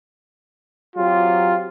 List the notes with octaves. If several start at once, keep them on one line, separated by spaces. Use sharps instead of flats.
F#3 C4 F4 G4